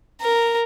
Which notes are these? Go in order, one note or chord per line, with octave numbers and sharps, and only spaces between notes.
A#4